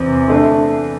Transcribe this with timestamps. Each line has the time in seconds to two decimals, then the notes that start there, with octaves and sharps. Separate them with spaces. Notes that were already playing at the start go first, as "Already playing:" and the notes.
Already playing: E2 C3 C4
0.28 D3 A3 D4 A4